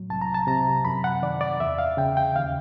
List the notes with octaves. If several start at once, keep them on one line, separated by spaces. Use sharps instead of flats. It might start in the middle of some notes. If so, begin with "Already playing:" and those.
Already playing: A2 F#3
C2 A5
A#5
A5
C3 A#5
F#2 B5
F#5
D#3 D5
D5
E2 E5
F5
C#3 G5
G5
D#2 F5